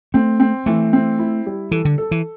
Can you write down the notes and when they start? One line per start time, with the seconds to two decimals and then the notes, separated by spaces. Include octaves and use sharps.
0.14 A3 C4
0.40 C4
0.66 E3 A3
0.93 C4
1.19 E4
1.46 G3
1.72 E3 A4
1.85 D3
1.98 A4
2.11 E3